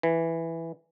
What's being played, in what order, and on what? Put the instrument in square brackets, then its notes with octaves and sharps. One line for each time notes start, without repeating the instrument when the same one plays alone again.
[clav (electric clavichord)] E3